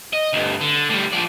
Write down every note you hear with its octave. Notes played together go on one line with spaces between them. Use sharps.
D#5
D2 G2
D3
A2 G3
F3 D5